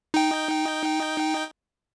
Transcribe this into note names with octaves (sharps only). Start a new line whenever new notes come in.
D#4 G5